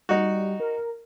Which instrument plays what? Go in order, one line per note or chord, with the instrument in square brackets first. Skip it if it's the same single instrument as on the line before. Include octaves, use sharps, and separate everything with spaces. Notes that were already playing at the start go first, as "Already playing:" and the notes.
[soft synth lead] G3 [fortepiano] D#4 F#4
[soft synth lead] A#4